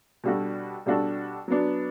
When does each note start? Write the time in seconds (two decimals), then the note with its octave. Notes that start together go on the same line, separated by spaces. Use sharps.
0.24 B2 G3 D4 F#4 A4
0.86 B2 G3 D4 F#4 A4
1.48 F#3 B3 D4